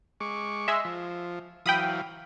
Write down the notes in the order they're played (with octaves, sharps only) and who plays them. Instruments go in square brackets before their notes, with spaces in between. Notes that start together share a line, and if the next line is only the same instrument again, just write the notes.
[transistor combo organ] G#3 C#6 D6
[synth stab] G#3 E5 [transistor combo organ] C6
[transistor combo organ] F3
[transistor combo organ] E3 F#3 F5 [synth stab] G5 B5 D#6